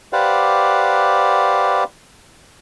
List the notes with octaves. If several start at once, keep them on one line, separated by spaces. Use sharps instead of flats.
G4 B4 C5 D5 F5 F#5